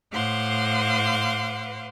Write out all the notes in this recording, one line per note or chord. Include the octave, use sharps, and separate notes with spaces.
A2 C5 F5 F#5 C6 D6